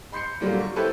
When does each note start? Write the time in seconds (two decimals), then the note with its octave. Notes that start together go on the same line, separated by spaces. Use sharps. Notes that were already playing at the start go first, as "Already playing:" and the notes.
0.12 B5 C6 G6 C7 C#7
0.41 A#2 D3 F#3 G3 A#3
0.61 C#6
0.76 C#4 E4 G4 A4 B4 C5